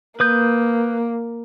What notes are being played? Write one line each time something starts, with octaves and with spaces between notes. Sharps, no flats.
A#3 B4 D#6 G6